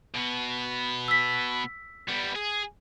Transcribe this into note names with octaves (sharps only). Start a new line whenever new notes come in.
B2 B3
E6 B6
G3 B3
G#4